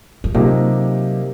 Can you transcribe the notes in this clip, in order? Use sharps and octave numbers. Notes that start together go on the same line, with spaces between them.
F3
C3 F3 F#3 A#3 D#4 G4